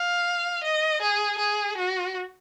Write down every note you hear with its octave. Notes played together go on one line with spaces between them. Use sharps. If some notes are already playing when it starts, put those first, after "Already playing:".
Already playing: F5
D#5
G#4
G#4
F#4